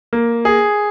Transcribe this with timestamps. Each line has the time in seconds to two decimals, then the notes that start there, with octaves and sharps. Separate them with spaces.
0.13 A#3
0.45 G#4